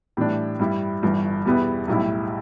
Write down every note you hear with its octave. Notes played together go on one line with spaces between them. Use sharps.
A2 E3 G3 D4
G2 G3 E4
G1 G2 E3
E2 B2 G3 B3 E4
B1 A2 G3 E4